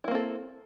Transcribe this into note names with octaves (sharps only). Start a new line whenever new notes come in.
A#3 C4 E4 A4